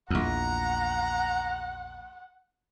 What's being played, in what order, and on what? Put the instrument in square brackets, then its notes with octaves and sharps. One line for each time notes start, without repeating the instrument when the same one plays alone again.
[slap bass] A#1 E2 [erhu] F#5 [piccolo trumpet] A#5